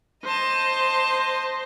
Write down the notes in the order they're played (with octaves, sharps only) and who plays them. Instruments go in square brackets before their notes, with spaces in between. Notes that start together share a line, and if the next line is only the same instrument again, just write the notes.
[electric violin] C5 [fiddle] D#5 A5